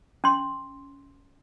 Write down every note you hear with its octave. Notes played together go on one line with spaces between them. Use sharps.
C#4 C6